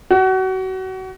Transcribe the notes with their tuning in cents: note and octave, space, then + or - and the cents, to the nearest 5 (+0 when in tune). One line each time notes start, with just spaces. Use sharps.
F#4 +30